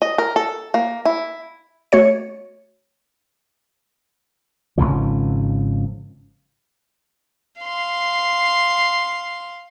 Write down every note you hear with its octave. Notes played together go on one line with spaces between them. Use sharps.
D#5
A#4
A4
A#3
E4
A3 F#4 C#5 C#7
G#1 D2 C#3 F3
F5 C6